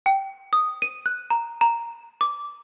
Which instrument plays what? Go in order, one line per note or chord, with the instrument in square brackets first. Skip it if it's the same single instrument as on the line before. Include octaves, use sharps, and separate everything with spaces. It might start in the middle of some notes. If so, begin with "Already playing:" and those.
[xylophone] G5
D#6
D#7
F#6
A#5
A#5
D6